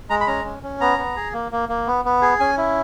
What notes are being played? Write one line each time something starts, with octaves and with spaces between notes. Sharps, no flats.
G#3 A#5
B5
C#4 A#5
C#4
C#4
B3 A#5
B3
G#4
A#3
A#3
A#3
B3
B3
G#4
C#4 G#5
E4